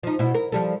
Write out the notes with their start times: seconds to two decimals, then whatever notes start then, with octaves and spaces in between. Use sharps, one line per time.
0.03 F3 D#4
0.19 B2 E4
0.34 A#4
0.52 F3 G3 A4